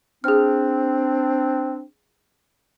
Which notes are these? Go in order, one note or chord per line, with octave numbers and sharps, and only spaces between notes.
C4 D4 G#4 F6